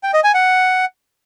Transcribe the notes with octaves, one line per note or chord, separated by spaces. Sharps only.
G5
D#5
G#5
F#5